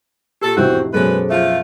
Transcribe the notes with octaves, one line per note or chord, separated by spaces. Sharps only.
A#2 G4 A4
F1 E2 A2 C4 F#4
F#2 B2 G#3 C#4 G#4 A4 B4 C5
F3 A3 F4